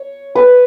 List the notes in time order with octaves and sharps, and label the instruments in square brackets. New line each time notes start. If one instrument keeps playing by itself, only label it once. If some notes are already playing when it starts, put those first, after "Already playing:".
Already playing: [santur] C#5
B4